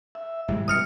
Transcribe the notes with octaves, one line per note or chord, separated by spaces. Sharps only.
E5
G#2 E3 G3 G#3 E4
G2 B2 D#6 F6 C#7